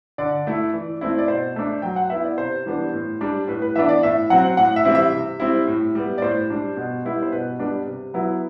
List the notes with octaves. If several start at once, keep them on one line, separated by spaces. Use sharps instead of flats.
D3 D5
A3 E4
E3
A3 C4 E4
D5
B2 C5
A3 D4
F#3 G5
F#5
B3 E4 E5
D5
C3 C5
E3 G3 B3 D4
A2
G3 D4
A2 B4
B4
E3 B3 D4 E5
D5
A2 E5
F#3 C4 F#5
A2 F#5
E5
E3 G3 C4 E4
E5
C3
G3 C4 E4
A2
G3 B3
D5
A2 C5
G3 D4
B2
G3 B3 E4
C5
B2 B4
G3 B3 D4
C3
F#3 B3 E4